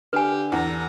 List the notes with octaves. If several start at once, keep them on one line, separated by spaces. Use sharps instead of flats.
D3 G4 B4 G#5
E2 A4 A#5